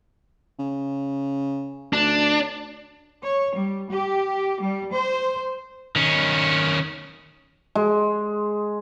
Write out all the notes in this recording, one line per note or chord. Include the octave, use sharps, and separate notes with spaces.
C#3
D2 D4
C#5
G3
G4
G3
C5
D#3 C#4
G#3